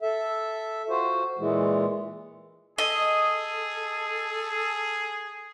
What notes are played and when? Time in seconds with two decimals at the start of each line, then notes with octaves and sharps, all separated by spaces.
0.02 A4 E5
0.90 F4 F#4 C5
1.39 A#2 E3 G#3
2.78 G#4 A4 D#5